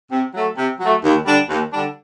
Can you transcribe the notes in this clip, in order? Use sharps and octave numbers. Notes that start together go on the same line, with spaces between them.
C3
F#3 A3
C3
F#3 A3
D#2
D3 G3 D4
D#2
D3 G3 D4